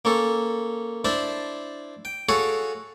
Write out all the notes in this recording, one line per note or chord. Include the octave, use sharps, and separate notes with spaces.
A#3 C#4 A4
D4 E4 C5 A5 C6
G5
F#4 G#4 A4 C#5 F5 G#5